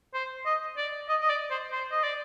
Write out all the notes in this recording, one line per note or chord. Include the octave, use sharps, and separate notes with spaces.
C5
D#5
D5
D#5
D#5
D5
C5
C5
D#5
D5